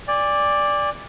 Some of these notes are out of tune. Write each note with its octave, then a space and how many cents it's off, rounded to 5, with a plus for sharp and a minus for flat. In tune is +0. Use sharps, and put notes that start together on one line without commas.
D5 +0 G#5 -40